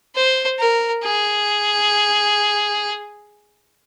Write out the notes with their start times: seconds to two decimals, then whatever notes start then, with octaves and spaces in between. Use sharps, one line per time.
0.15 C5
0.59 A#4
1.04 G#4